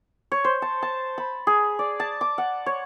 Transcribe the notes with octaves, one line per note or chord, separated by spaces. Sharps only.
C#5
C5
A5
A5
B5
G#4
D5
A5
D6
F#5
C#5